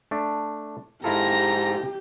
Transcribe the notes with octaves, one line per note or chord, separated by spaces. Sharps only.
A3 D4
G#2 E4 F4 G4 A4 A#5 A#6